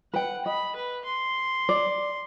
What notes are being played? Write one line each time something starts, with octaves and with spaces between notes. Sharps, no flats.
B4 F#5 G5
D#5 B5
B4
C6
D5